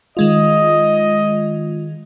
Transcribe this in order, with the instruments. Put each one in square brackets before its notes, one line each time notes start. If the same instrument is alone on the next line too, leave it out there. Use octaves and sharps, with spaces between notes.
[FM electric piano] D#3 G#3 F4 [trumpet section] D#5